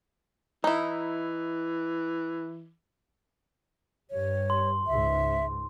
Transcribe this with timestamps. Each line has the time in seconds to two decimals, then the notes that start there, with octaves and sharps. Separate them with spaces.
0.64 E3 D#4 E4
4.11 G2 C#5
4.50 C6
4.87 C#2 G#2 E5